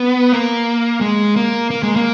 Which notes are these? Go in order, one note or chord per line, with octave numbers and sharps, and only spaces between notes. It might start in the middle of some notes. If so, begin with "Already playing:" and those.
Already playing: B3
A#3
G#3
A#3
A#3
G#3
A#3